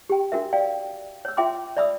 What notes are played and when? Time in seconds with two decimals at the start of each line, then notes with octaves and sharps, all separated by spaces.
0.10 G4 G5
0.32 D4 F#4 A#4 E5
0.53 D5 F5 G5
1.25 C#5 E6
1.37 F4 E5 G5 C6 D6
1.77 D5 E5 B5 D#6 E6